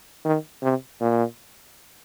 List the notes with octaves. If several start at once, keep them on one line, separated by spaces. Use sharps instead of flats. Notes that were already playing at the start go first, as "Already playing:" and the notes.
D#3
C3
A#2